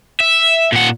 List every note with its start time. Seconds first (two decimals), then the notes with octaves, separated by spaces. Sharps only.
0.20 E5
0.72 A#2 F#5